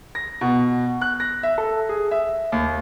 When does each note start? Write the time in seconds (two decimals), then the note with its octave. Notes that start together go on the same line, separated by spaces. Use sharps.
0.15 A#6
0.41 B2
1.01 F#6
1.20 A#6
1.43 E5
1.58 A4
1.89 G#4
2.11 E5
2.52 D#2